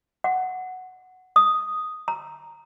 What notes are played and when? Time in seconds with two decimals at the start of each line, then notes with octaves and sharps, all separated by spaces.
0.24 F#5
1.36 D#6
2.08 A#5